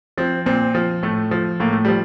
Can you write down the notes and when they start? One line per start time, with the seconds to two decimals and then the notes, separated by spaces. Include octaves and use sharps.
0.18 F3 C4
0.46 A#2 C4
0.75 F3
1.03 A2 A3
1.31 F3
1.60 A2 A#3
1.73 A3
1.85 F3 G3